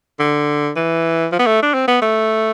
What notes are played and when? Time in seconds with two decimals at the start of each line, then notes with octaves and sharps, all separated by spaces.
0.20 D3
0.76 E3
1.32 F3
1.39 B3
1.47 A3
1.63 D4
1.74 C4
1.88 B3
2.02 A3